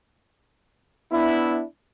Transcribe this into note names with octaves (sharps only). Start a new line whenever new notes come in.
B3 D4 E4